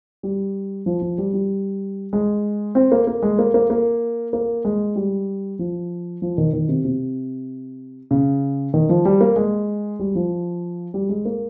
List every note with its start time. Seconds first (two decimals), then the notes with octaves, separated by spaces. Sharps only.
0.23 G3
0.86 F3
1.02 F3
1.18 G3
1.33 G3
2.13 G#3
2.75 C4
2.92 A#3
3.07 A#3
3.23 G#3
3.39 A#3
3.54 A#3
3.70 A#3
4.33 A#3
4.65 G#3
4.96 G3
5.59 F3
6.22 F3
6.38 D#3
6.53 D#3
6.69 C3
6.85 C3
8.11 C#3
8.74 D#3
8.89 F3
9.05 G3
9.21 A#3
9.36 G#3
9.99 G3
10.15 F3
10.94 G3
11.09 G#3
11.25 A#3